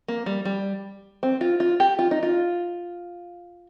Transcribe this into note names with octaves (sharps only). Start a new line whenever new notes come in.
A#3
G3
G3
C4
F4
F4
G4
F4
D#4
F4